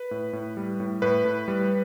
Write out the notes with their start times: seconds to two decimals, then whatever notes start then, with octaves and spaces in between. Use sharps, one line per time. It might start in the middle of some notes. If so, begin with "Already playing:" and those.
Already playing: B4
0.11 A2
0.33 A2
0.57 G3
0.80 A2
1.02 A2 B4
1.25 A2
1.48 G3